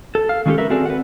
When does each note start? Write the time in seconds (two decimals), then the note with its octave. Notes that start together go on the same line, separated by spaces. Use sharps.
0.15 A4
0.29 F5
0.46 D#3 G#3 C#4 F4 G4 A4
0.58 A#4 B4 E5
0.70 C4 F#4 G#4 A4 D5
0.86 B4 F#5